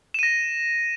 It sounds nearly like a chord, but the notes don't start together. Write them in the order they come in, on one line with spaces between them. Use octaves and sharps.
E7 D#7 A#6